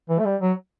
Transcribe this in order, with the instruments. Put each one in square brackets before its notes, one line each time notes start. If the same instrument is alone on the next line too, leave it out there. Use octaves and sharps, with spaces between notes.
[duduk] E3
A3
G3
F#3